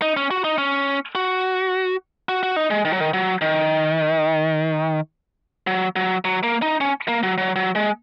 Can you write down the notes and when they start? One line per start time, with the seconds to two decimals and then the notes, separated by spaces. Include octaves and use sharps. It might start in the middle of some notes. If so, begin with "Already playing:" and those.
0.02 D#4
0.17 C#4
0.31 F#4
0.44 D#4
0.58 C#4
1.15 F#4
2.29 F#4
2.43 F#4
2.56 D#4
2.71 G#3
2.85 D#3
2.93 F#3
3.00 D#3
3.14 F#3
3.41 D#3
5.67 F#3
5.96 F#3
6.25 F#3
6.43 A#3
6.62 D#4
6.81 C#4
7.08 A#3
7.23 F#3
7.38 F#3
7.56 F#3
7.75 G#3